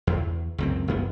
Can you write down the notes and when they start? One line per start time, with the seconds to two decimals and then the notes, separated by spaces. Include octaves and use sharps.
0.07 E2
0.58 C#2 F#2 C4
0.88 G1 F#2 B3